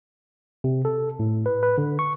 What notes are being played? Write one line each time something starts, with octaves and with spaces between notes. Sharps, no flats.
C3
A4
A2
B4
B4
D3
C#6